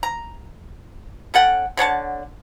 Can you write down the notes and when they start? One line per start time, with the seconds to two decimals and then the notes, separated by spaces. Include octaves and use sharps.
0.03 A#5
1.34 C#4 A4 F#5 G5
1.77 D3 C#5 F#5 A5